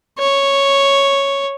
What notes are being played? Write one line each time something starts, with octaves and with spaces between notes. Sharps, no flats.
C#5